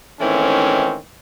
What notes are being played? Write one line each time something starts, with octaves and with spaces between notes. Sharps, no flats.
G#2 D#3 E3 A3 C4 C#4